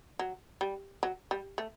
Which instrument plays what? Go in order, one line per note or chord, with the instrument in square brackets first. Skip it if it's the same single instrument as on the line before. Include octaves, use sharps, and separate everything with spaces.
[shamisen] F#3
G3
F#3
G3
A3